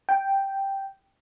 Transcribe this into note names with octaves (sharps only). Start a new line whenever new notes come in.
G5